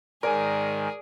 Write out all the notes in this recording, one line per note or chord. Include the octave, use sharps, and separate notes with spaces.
G#2 D#3 G#4 A#4 D5 G#5